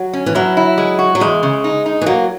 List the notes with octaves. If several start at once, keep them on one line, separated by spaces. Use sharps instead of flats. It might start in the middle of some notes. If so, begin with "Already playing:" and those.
Already playing: F#3
C#4
E3
F#3 E4
E4
G#3
F#4
F#3
E2 G#3
C#3
D#4
D#4
E3
F#3 A#3